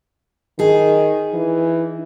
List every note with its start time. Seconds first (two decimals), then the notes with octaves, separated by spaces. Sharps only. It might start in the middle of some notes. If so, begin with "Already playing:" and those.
0.59 D#3 D#4 G#4
1.34 E3